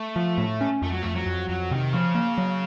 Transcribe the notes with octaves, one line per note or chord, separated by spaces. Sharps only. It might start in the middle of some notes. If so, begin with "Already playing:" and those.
Already playing: A3
F3
A2
C#4
F2 A3
F#3
F2 A3
F#3
F2
F2 F#3
C3 D#3
C#3 F3
A#3
F#3